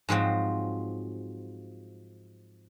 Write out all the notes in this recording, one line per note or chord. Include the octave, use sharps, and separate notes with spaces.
G#2 F3 F#3 C4